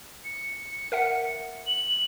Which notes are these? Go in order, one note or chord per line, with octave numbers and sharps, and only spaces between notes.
C#7
A#4 E5 F#5
F#7